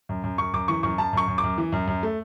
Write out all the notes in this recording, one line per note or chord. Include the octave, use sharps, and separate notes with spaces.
F#2
F#2
F#2 C#6
F#2 D6
E3 C#6
F#2 C#6
F#2 A5
F#2 C#6
F#2
D6
F#2
E3
F#2
F#2
A3